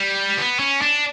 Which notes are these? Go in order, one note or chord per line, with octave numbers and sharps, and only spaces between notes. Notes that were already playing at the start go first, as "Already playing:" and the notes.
Already playing: G3
B3
C#4
D4